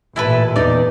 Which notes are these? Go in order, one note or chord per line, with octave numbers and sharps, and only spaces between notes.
A1 A#2 E4 A4 B4
E2 D#4 D5